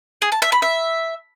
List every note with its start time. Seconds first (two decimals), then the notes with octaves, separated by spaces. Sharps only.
0.22 G#4
0.32 A5
0.42 E5
0.52 B5
0.62 E5